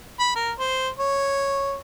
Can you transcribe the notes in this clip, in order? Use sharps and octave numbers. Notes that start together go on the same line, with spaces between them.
B5
A#4
C5
C#5